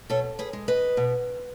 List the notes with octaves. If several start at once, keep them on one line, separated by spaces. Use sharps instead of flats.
B2 A4 C#5
G#4 B4
G#3
B4 D#5
B2